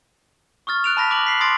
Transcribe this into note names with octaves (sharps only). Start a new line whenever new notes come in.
C#6 D#6 F6 A6
F#6 D7 F7
A5 B5 A#6 B6
D6 F#6 D7 F#7
B6 C7 F#7
C6 D6 D#6 A6 A#6 D7